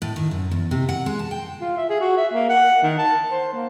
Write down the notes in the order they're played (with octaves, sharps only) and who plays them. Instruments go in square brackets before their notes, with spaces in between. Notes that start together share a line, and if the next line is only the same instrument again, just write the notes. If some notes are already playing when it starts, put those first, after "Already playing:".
[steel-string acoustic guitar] A2
D#3
F#2
E2
C3
F#5
G#3
A5
G5
[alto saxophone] F4
E5
G#4
F#4
E5
A#3
F#5
D#3
A5
C5
A#3